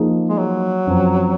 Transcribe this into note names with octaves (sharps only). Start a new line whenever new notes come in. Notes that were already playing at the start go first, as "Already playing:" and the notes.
Already playing: F3 A#3 D#4 G#4
G#3
F#3
F#2 F3 C4